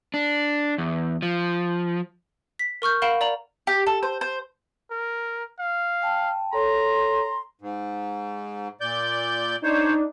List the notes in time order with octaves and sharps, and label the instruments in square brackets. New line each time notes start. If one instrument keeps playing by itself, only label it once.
[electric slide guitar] D4
E2
F3
[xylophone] B6
A#4 C#6 F6 G6
A#4 F5 F#5 B5 D7 E7
D5 A#5 F#7
[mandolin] G4
A4
C5
C5
[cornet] A#4
F5
[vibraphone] G5 A5
[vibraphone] A4 C#5 [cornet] A#5 [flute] C6
[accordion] G#2
A#2 D5 G6
[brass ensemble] D4 D#4 [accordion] C5 C#5